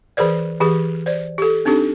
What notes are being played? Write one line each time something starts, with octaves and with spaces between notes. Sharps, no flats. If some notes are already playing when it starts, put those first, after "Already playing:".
E3 G#4 A#4 C5 D5
E3 G4 G#4
C5 D5
G4 A4
C4 D4 D#4 G4 A4